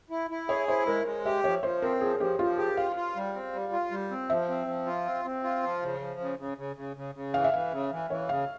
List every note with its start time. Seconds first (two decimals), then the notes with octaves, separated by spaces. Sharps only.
0.10 E4
0.31 E4
0.49 G#4 C#5
0.68 E4 C5
0.86 G#3 A#4
1.05 G#3
1.25 G4 E5
1.44 F3 C#5
1.63 F3 C5
1.82 C4 A#4
2.01 F3 G#4
2.20 F3 G4
2.39 F3 F4
2.58 G4 G#4
2.77 F4 F5
2.96 F4
3.16 G3
3.34 C4
3.53 G3
3.72 F4
3.91 G3
4.10 C4
4.30 F3 E5
4.49 C4
4.67 F3
4.86 F4
5.05 C4
5.25 C4
5.44 F4
5.63 F3
5.82 C#3
6.00 F3
6.20 C#3
6.39 C#3
6.58 C#3
6.76 C#3
6.97 C#3
7.15 C#3
7.34 E3 F5
7.44 E5
7.53 E3 F5
7.72 C#3
7.92 E3
8.10 E3 C#5
8.29 C#3 F5